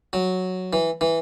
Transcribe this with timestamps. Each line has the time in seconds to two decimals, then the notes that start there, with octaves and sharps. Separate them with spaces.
0.13 F#3
0.73 E3
1.01 E3